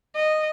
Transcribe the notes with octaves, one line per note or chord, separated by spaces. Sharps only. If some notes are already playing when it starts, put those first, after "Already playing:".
D#5